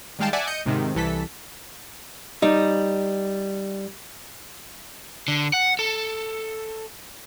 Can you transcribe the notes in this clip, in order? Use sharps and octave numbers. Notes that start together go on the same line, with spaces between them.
D#3 G3 G#3 F5 G5 A5
D5 E5 F#5 G#5 A5
D#5 G6 C#7 D#7
G#2 C3 D#3
C2 E3 A4 B6
G3 D#4
D3
F#5
A4